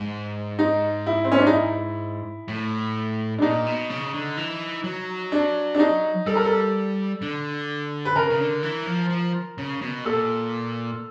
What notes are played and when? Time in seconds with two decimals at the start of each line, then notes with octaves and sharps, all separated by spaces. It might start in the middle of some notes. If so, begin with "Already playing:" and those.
Already playing: G#2
0.59 D#4
1.06 E4
1.24 C4
1.32 C#4
1.38 D4
1.46 D#4
1.53 E4
2.48 A2
3.38 D4
3.42 A#2 D#4
3.66 B2
3.90 C#3
4.13 D3
4.37 E3
4.84 F#3
5.32 D4
5.75 D4
5.79 D#4
6.26 G3 A4
6.35 A#4
6.45 A4
7.22 D3
8.05 B4
8.16 C#3 A#4
8.30 C#3
8.40 D3
8.63 E3
8.86 F3
9.10 F3
9.58 C#3
9.81 B2
10.05 A#2 A4